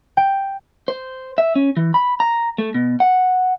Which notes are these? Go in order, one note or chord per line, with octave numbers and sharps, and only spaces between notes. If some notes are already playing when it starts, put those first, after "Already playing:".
G5
C5
E5
C#4
E3
B5
A#5
A3
B2
F#5